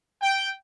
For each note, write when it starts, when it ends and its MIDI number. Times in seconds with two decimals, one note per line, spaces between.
0.21 0.49 79